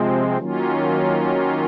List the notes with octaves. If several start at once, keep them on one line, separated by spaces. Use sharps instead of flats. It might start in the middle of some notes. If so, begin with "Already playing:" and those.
Already playing: C3 F3 G#3 C4
D#3 F#3 A#3 C#4 F4